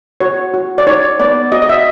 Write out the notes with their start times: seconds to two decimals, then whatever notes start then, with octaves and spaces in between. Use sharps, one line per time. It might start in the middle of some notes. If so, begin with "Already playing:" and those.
0.20 F#4 C#5
0.54 F#4
0.78 D5
0.86 D#4 C#5
1.20 B3 D5
1.52 F#4 D#5
1.62 D#5
1.69 E5